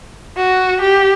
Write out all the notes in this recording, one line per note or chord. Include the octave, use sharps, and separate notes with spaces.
F#4
G4